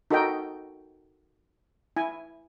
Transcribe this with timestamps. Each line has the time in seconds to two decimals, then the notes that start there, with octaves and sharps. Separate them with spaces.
0.11 D#4 F#4 A4 A#4 D#5 G5
1.97 E4 G#5